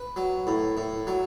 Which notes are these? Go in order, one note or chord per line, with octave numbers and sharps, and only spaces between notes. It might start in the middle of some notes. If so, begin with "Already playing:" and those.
Already playing: B4
F#3
A2
A2
F#3